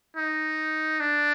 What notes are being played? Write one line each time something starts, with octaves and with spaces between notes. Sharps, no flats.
D#4
D4